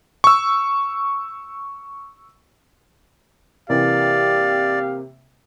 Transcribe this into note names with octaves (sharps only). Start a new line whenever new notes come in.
C#6 E6
C3 E3 A#3 G4 D5 F5